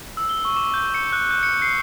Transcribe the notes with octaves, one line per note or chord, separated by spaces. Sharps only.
E6
G7
C#6
D6
G6
C#7
F#6
G6
C#7
C7